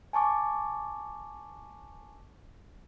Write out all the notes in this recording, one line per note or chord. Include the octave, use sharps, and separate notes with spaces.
G#5 A5 C#6 D6